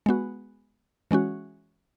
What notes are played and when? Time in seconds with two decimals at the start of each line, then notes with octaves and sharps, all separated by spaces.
0.06 G#3 B3 F#4
1.11 E3 G#3 C#4 F#4